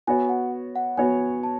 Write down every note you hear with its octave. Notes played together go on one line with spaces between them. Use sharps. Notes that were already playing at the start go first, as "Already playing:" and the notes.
B3 F#4 C#5 G#5
F#5
F#5
B3 F#4 C#5 G#5
A5